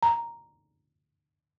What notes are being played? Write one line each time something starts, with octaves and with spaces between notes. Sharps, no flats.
A#5